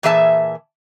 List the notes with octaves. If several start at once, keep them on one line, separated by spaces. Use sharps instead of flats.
A#2 E3 G#4 E5 A5